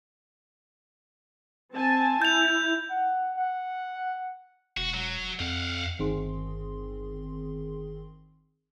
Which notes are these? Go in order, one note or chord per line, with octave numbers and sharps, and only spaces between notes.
C4 G#5 A5
E4 G6 F7
F#5
F#5
E1 F#4
F#3
F2 F5 F#5
G1 D#3 C4 G#4 C6